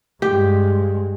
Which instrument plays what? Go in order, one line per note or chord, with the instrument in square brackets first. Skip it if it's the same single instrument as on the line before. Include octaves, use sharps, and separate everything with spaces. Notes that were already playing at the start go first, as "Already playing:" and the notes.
[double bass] G2 G#3 [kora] G4